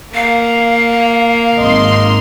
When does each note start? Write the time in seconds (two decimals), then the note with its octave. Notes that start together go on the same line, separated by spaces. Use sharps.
0.15 A#3 F5
1.58 G#1 D#5 C6